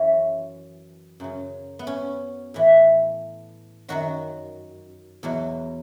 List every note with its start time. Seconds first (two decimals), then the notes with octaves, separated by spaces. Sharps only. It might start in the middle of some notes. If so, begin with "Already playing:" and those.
Already playing: F#2 E3 C#4
1.20 F#2 C#3 F#3
1.79 B3
1.87 C#4
2.54 A2 E3
3.88 F#2 D#3 F#3 F#4
5.23 E2 B2 F#3